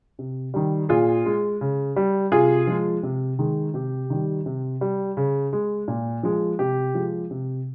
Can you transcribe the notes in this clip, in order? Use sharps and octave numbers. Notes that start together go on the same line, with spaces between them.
C3
D#3 G3
A#2 F4 G#4
G#3
C#3
G3
C3 F4 G#4
F3 G#3
C3
D#3 G#3
C3 G4
D#3 G3
C3
G3
C#3
G#3
A#2
F3 G#3
C3 G4
F3 G#3
C3